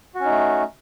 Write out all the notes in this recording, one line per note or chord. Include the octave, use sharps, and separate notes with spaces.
A3 C#4 D#4 F#4